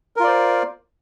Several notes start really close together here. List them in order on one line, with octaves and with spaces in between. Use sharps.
A#4 F4 D5 C5